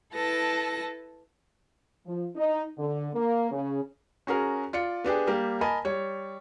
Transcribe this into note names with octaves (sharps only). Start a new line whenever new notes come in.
E4 A4 B4 A5 A#6
F3
D#4
D3
A#3
C#3
C#4 F#4 G#4 A#4
F4 D5 C#7
B3 D4 G4 G#4
G3 A#3 G4
A#4 D#5 G#5 A5 B5
G3 C#5